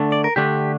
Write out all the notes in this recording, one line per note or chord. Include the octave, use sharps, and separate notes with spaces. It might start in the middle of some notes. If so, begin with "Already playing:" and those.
Already playing: D3 A3 D4
D5
A#4
D3 A3 D4 G4